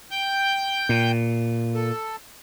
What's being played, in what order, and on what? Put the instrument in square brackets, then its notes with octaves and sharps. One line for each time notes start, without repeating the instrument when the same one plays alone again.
[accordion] G5 G6
[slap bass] A#2
[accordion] A4